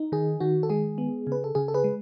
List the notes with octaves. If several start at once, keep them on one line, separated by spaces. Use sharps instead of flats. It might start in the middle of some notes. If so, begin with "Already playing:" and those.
Already playing: D#4
D#3 G#4
D#3 F#4
A4
G#3 G#4
B3
C#3 B4
A4
C#3 G#4
A4
G#4 B4
G#3